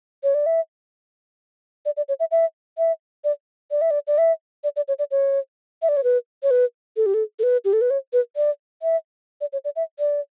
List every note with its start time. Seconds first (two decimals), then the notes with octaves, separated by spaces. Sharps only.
0.23 C#5
0.34 D5
0.46 E5
1.86 D5
1.97 D5
2.08 C#5
2.20 E5
2.31 E5
2.78 E5
3.24 D5
3.71 D5
3.81 E5
3.91 D5
4.07 D5
4.18 E5
4.64 D5
4.76 D5
4.88 C#5
4.99 D5
5.11 C#5
5.82 E5
5.89 D5
5.97 C#5
6.04 B4
6.43 C#5
6.51 B4
6.97 A4
7.06 G4
7.14 A4
7.39 A4
7.43 B4
7.65 G4
7.73 A4
7.81 B4
7.90 C#5
8.13 B4
8.36 D5
8.82 E5
9.41 D5
9.53 C#5
9.65 D5
9.76 E5
9.99 D5